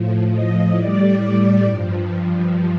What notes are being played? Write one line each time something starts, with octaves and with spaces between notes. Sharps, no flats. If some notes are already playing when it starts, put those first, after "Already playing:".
Already playing: A2 F3
D#5
A2 G3 D5
G2 F3